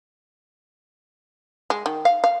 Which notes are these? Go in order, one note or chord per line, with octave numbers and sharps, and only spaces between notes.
G#3
D#3
F5
F5